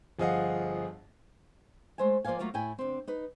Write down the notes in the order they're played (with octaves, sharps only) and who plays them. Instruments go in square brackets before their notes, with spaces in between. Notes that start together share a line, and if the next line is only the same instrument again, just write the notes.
[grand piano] G1 F3 G#4 D#5 F5 F#5
[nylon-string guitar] G#3 A3 C5 E5 G#5
F3 A#3 C5 D5 F5 G#5
F#3 A3 A#3 F4 F#4
A2 E4 G5 G#5
D3 C4
D#4 B4